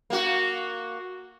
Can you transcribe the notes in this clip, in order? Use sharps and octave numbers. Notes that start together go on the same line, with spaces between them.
A#3 F#4